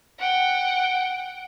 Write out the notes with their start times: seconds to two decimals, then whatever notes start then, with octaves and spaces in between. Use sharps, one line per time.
0.19 F#5 G5